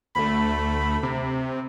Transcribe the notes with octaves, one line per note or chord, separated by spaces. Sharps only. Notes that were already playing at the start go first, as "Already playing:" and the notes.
D2 A3 B5
C3